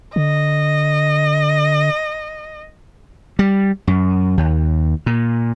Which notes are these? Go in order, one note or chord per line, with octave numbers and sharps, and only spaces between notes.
D3 D#5
G3
F#2
D#2
A#2